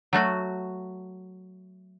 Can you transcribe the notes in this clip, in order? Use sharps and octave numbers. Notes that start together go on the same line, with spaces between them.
F#3 A3 F#4